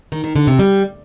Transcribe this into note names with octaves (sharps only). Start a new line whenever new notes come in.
D#3
D#3
D3
C3
G3